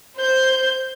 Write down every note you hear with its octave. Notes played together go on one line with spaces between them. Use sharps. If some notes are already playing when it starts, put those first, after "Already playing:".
C5 G6